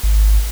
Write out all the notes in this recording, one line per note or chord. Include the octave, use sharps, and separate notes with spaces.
G#1